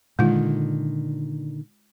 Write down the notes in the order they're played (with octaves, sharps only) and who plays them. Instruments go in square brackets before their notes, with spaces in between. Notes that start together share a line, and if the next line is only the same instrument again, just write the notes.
[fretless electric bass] A#2 D3 D#3 [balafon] G#3 D#4 F4